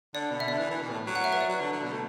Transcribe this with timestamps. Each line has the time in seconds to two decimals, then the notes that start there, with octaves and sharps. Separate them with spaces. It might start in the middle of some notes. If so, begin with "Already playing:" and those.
0.15 D3 D5
0.31 B2
0.40 E5
0.48 D3 D5
0.59 E3
0.71 E3
0.82 B2
0.90 A2
1.07 F#3
1.15 F#5
1.24 E5
1.33 B4
1.41 D5
1.49 F#3
1.61 D3
1.72 D3
1.83 B2
1.92 A3